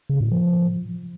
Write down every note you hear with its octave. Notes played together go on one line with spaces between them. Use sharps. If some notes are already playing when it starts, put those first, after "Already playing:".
C#3
A2
F3